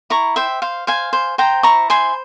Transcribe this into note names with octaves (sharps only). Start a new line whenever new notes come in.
E4 A#5 C#6
C5 E5 G5
C5 F5
C5 F5 G#5
C5
C5 G5 A#5
E4 A#5 C#6
C5 G#5 C6